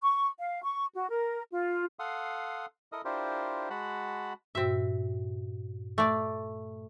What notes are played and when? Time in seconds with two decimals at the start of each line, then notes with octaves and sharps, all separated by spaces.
0.01 C#6
0.38 F5
0.63 C#6
0.94 F#4
1.09 A#4
1.52 F4
1.99 A4 F5 F#5 C6 D#6
2.92 E4 A4 A#4 D#5 D#6
3.05 D4 E4 F4 G4 A#4 C5
3.70 G#3 F#4 F#5 A5 B5
4.55 G2 A#2 C4 F#4 E5
5.98 A3 D5